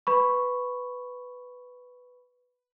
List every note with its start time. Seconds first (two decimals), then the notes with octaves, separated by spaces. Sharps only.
0.07 B4 B5 C#6